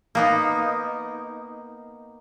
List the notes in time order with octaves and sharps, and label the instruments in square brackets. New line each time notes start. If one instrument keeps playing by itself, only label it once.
[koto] A#3 B3 D#4